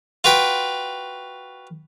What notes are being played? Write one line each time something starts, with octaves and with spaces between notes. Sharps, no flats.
F4 F#4 B4 G5